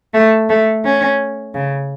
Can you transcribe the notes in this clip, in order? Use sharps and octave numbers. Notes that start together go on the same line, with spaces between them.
A3
A3
C#4
C#3